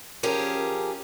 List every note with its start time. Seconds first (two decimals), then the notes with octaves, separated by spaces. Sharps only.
0.23 F3 C#4 G4 G#4 A#4